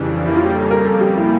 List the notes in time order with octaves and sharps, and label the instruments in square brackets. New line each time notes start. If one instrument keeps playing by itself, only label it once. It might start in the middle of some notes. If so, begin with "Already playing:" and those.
Already playing: [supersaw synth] F2 C#3 E3 G3 D4
[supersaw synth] F2 C#3 G3 A#3 [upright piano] E4
[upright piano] F4
G4
A4
A#4
A4
G4
E4